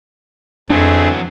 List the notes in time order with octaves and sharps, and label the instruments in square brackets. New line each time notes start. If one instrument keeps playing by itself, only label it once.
[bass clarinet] F2 [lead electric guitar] E3 F#3 [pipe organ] A3 C4 G#4 [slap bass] D4